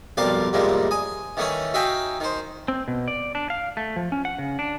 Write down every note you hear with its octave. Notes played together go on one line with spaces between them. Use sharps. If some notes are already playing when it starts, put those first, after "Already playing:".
B1 F2 G3 A#4 F5 D6
F2 A2 C3 G3 G#3 A#3
G#5 D#6
D#3 E3 A3 C#4 C#5
D#4 F#4 E5 F5 G5 G#5
D#3 C5
C4
B2
D5
D4
F5
A3
F3
C#4
F#5
C#3
D4